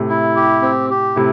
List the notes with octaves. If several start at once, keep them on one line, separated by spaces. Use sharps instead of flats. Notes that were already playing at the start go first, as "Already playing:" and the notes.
Already playing: A2 C3
E4
G4
C4
G4
A2 C3 E4